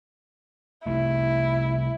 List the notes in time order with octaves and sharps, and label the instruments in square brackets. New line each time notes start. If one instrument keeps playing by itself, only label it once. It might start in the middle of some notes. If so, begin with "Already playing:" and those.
[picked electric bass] C2 C3 A3 [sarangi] E4